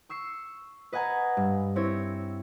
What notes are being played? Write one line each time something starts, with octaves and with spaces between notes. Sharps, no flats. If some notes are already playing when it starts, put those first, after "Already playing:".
C#6 E6 C7 C#7
B4 D#5 F#5 G#5 A#5
G2
C4 E4 C#5 A#6